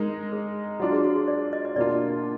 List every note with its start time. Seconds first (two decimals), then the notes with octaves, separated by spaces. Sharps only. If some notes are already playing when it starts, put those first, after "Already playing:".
Already playing: G#3 D#4 A#4
0.32 G#4
0.79 F#3 D4 F4 F#4
0.92 G#4
1.05 F#4
1.16 G#4
1.28 D5
1.53 D#5
1.65 D#5
1.76 B2 A#3 D4 F4 D5